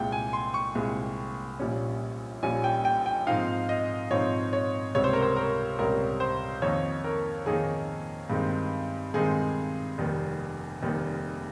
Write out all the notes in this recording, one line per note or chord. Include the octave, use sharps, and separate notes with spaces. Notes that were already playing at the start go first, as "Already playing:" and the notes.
Already playing: C2 A#2 G#3 G5
G#5
C6
C#6
C2 A#2 G#3
A#1 A#2 G3 C#4
A#1 A#2 G3 C#4 G#5
G5
G5
G5
G#2 F3 C4 D#4 F5
D#5
G#2 F3 C4 D#4 C#5
C#5
C#2 C3 G3 C#5
C5
A#4
C5
A#4
C#2 C3 G3 A#4
C5
F2 D#3 A#3 D#4 C#5
A#4
F2 D#3 A#3 D#4 G#4
G2 D#3 G#3 C4 D#4
G2 D#3 G#3 C4 D#4 G#4
F1 D#2 D#3 G3
F1 D#2 D#3 G3